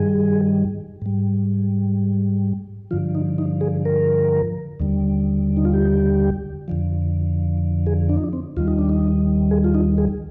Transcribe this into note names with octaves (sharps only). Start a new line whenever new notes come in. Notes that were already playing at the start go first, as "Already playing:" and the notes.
Already playing: G2 D#3 G3 G#4
G#2 G3
G2 D3 F3 F4
D#4
D#4
G#4
A#4
D#2 D3 G3
D#4
F4
G4
F2 D3 F3
G#4
D4
D#4
D4
C4
D#2 D#3 G3 F4
D#4
D4
D#4
G#4
F4
D#4
G#4